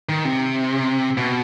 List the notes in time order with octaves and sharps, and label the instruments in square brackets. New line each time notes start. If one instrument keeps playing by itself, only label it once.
[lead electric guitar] D#3
C3
B2